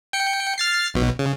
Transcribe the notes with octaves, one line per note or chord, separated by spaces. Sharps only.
G5 C#7
F6 A6 C7
B1 B2
C#3